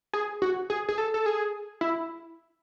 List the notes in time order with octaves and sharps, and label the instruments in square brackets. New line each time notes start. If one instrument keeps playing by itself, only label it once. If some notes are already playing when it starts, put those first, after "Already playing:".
[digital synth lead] G#4
F#4
G#4
G#4
A4
A4
G#4
E4